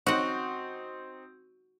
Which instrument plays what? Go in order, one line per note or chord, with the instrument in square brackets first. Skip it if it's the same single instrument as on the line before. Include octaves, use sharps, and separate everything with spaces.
[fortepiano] C4 D#4 [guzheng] F#4 F#5